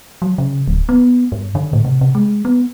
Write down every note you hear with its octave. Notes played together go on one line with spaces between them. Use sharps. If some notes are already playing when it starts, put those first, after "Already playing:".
F#3
C#3
D1
B3
G2
D3
A2
C3
C3
G#3
B3